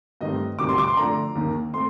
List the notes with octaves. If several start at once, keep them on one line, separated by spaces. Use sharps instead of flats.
G2 D#3 A3 C4 D#5
D2 C3 D#3 G3 D6
C6
D6
C6
F2 D3 A3 D4 A#5
D#2 D#3 A#3
A3 C4 C6